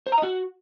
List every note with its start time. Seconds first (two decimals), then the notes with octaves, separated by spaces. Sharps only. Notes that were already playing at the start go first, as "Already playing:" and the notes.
0.07 C5
0.12 A#5
0.18 D#5
0.23 F#4